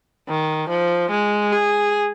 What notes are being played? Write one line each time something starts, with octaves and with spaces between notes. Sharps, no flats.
D#3
F3
G#3
G#4